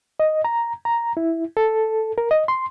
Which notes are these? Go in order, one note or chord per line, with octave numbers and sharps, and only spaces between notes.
D#5
A#5
A#5
E4
A4
A#4
D#5
C6